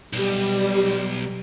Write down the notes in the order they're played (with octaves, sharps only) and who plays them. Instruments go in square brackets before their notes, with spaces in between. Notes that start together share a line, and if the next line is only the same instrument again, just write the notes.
[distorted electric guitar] B1 [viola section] G3